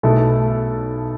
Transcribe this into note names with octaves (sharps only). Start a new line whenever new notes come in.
B1 B2 A3 E4 A4